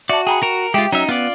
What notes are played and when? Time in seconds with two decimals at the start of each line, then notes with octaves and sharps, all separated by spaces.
0.10 F#4 D5 E5 A5
0.27 G#4 G5 A#5 B5
0.43 F#4 A#4
0.74 G#3 F4 G4 E5 G5
0.93 F#3 C#4 D#4 E5
1.09 B3 F4 D5